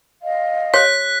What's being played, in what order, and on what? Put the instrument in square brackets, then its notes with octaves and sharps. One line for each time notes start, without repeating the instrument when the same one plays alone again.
[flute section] D#5 F5
[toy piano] G4 C#5 [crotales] F#6 B6